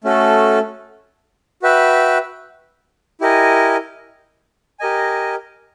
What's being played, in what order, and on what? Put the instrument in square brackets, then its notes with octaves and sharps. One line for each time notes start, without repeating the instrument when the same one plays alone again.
[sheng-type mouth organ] A3 C#4 F#4 A4
F#4 B4 E5 G5
E4 G4 A#4 D#5 G#5
G4 A#4 D#5 G#5